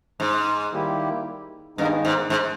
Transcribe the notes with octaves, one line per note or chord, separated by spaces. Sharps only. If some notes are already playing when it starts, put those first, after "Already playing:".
G#2
D#3 G3 A#3 E4 G4
G2 D#3 G#3 B3 D#4
G#2
G#2